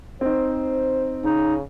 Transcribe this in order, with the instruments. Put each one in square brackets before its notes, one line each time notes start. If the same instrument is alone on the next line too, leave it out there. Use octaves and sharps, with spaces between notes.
[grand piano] C4 D#4 [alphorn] C5
[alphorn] C#3 [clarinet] D#4